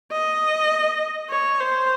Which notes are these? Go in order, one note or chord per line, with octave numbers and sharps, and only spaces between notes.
D#5
C#5
C5